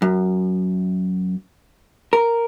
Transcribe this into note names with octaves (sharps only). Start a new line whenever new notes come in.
F#2
A#4